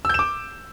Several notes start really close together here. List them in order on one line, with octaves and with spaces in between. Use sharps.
E6 G6 E7 D6